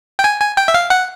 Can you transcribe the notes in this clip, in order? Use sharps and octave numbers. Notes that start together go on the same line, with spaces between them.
G5
G#5
G#5
G5
E5
F5
F#5